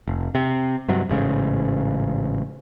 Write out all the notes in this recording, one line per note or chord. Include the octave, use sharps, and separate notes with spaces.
F1
C3
G2 C3 F#3
A1 G#2 C#3